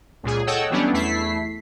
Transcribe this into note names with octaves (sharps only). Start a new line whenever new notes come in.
C#2 A#2 G#4
A4 C#5 D#5 F#5 G5 E6
E3 F#3 G3 B3 C#4 D4
E2 A3 E4 B6 C7